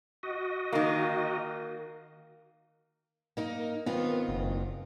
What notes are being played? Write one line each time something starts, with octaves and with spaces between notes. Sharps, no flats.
F#4 D#5
D#3 A#3
A#3 D#4 A#4
D#3 B3 C4 F4
F#1